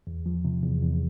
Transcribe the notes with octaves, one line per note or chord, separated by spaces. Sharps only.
E2
F3
C3
E2
E2